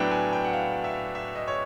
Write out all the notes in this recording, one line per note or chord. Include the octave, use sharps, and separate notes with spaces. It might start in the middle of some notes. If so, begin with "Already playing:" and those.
Already playing: A2 F#3 B3 D4 G5
G#5
G5
F#5
F5
E5
E5
D#5
C#5